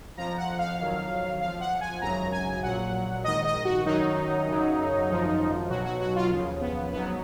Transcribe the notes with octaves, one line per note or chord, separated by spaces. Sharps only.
F2 F3 A#5
F#5
F5
F2 D#3 F#3
F2 F3 F5
F#5
G#5
G#1 F#2 C#3 F#3 A#5
G#5
A#1 A#2 F#3 F#5
A#1 G#2 D#3 D#5
D#5
F#4
F#2 D#3 F#3 D#4
F#2 C#3 F#3
G#1 F#2 F3
B1 B2 F#3 F#4
F#4
F#4
F4
D#2 C#3 F3
B3
G#1 G#2 F#3 B3